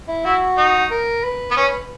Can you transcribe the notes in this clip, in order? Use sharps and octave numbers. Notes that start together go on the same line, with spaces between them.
E4
E4 F#4
D#4
A#4
B4
B3
C#4